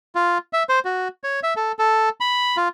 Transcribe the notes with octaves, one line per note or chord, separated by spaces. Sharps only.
F4
E5
C5
F#4
C#5
E5
A4
A4
B5
F4